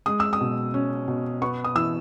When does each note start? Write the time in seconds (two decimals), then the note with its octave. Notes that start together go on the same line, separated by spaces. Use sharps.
0.06 G#3 D#6
0.20 E6
0.33 D#6
0.41 B2
0.74 C#4
1.08 B2
1.42 B3 C#6
1.64 D#6
1.75 E3 E6